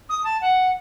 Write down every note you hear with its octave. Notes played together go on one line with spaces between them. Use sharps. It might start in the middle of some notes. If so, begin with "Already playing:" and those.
D#6
A5
F#5